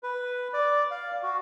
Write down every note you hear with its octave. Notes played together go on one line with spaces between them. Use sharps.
B4
D5
F5
F#4